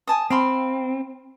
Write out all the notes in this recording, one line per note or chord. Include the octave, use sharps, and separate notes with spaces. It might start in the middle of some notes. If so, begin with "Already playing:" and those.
G#5 A5 D#6
C4 F5 B5 C6